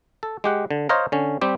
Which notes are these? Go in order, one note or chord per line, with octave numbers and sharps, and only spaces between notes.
A4
G#3 G4 F#5
D3
C5 C#5 D#5 F5 A#5
D3 C#4
G3 C4 G4